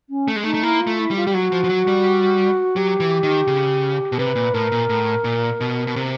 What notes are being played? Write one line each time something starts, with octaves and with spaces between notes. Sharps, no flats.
C#4
A3
G#3
A3 D#4
A3
A#3 E4
F4
A3
E4
G3
F4
G3 G4
F#3 F#4
F3
F3
F#3
G3
F#3 G4
E3
D#3
C#3
B2
C3 B4
A#2
A2 A#4
A#2
A2
A#2
B2
B2
C3